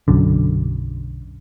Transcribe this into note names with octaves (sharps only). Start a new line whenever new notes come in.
B1 F#2 D3